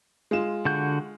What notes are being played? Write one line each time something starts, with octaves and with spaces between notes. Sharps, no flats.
G#3 F4 E7
D3 F#4 G6